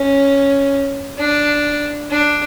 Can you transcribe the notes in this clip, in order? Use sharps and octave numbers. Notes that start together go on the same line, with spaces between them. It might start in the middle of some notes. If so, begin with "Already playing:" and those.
Already playing: C#4
D4
D4